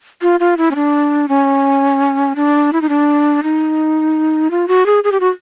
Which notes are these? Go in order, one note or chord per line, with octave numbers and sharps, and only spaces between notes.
F4
F4
E4
C#4
D4
C#4
D4
E4
D#4
D4
D#4
F4
F#4
G#4
G#4
G4
F#4